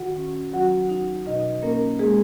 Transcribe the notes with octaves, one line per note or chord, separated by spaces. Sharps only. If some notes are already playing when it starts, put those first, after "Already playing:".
Already playing: D#3 F#4 F#5
C#4
F#3 F#4 F#5
D#4
B2 D#4 D#5
A#3 C#4 A#4
G#3 A#3 G#4